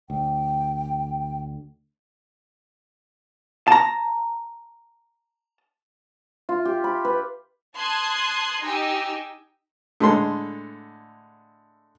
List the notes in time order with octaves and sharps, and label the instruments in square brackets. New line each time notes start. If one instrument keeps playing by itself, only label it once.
[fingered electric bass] D2 [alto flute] G5
[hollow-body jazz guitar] A5 A#5
[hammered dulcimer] F4
G4
B5
B4
[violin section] A5 C6 D#6 F#6 G#6
D#4 G4 G#5 E6
[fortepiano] A2 D3 G#3 A4 C6